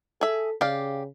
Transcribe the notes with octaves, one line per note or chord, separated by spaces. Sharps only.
G#4 A4 E5
C#3 G4 D5 F5